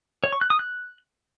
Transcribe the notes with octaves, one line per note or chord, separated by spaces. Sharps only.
C#5
C#6
F#6
D#6
F#6